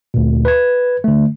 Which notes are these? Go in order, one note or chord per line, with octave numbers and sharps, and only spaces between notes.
D2 A#2
B4 G#6
D3 A3